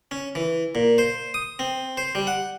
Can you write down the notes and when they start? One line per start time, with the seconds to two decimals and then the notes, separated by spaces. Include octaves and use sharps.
0.11 C#4
0.35 E3
0.75 A#2
0.98 C5
1.34 D#6
1.59 C4
1.97 C5
2.15 G3
2.27 F#5